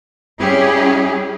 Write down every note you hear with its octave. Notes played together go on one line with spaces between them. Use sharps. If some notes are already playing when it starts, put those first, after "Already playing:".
G3 C#4 E4 G4 G#4